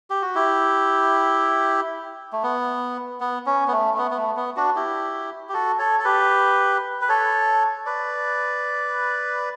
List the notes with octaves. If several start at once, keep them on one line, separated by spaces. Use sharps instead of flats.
G4
F#4
E4 G4
A3
B3
B3
C#4
B3
A3
A3
B3
B3
A3
B3
D4 F#4
E4 G4
G4
F#4 A4
A4 C#5
A4
G4 B4
B4
A4 C#5
B4 D5